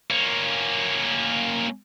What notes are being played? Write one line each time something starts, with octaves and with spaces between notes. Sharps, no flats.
A#3 C#4